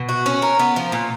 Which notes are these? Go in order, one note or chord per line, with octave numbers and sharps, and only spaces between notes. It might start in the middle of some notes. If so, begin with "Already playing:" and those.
Already playing: B2
F#4
C#4
A#4
B3
F3
A#2